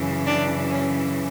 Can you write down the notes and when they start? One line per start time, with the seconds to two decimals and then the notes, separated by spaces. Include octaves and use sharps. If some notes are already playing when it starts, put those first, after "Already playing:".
Already playing: F#2 C#3 E3
0.27 D4
0.70 C#4